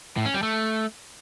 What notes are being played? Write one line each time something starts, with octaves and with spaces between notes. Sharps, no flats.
A2
C#4
G3
A3